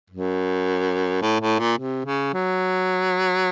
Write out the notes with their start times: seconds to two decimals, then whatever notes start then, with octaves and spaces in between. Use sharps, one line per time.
0.10 F#2
1.22 A2
1.40 A2
1.59 A#2
1.78 C3
2.06 C#3
2.33 F#3